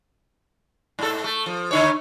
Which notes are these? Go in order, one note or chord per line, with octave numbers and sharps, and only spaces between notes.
G#2 A4
A3
F3
D3 D#4 C#5